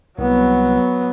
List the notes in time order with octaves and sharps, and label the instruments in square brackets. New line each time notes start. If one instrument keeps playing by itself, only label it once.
[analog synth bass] C2 [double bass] F#3 B3